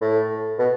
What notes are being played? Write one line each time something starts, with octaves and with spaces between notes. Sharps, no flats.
A2
B2